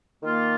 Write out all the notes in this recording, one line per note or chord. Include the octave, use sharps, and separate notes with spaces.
D#3 A#3 F4